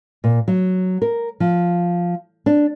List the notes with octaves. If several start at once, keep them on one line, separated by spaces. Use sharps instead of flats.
A#2
F#3
A#4
F3
D4